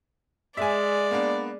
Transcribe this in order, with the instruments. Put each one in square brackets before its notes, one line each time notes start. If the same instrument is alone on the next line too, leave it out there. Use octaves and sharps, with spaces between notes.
[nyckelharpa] G#3 [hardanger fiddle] D5 [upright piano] E5 G#5
[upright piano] A#3 B3 D4